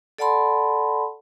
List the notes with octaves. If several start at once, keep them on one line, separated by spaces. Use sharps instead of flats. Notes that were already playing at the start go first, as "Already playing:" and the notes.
A4 D5 F#5 A5 B5 C6